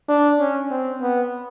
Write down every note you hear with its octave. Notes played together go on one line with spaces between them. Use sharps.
D4
C#4
C4
B3